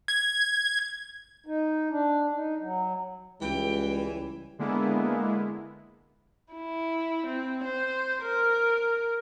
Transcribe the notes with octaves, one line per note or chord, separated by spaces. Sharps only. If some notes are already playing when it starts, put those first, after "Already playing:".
G#6
D#4
D4
D#4
F#3
C#2 E3 G3 G5
D3 G#3 A#3 B3 E4
E4
C4
C5
A#4